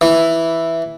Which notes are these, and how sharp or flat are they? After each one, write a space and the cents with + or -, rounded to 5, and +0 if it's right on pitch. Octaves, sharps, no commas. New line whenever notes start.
E3 +0